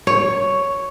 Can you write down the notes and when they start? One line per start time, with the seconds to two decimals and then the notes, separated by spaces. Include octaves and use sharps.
0.07 C#5